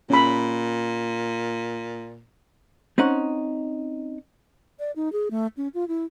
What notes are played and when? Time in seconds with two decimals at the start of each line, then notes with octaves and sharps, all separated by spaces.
0.10 A#2 C#4 B5
2.98 C4 C#4 D#4 F#5
4.79 D5
4.96 D#4
5.12 G#4
5.31 A3
5.57 C#4
5.74 F4
5.88 E4